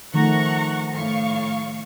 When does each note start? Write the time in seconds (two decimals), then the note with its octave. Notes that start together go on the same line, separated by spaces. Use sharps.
0.14 D#3 F3 A3 F#5 A#5 C#6
0.94 A2 F5 C#6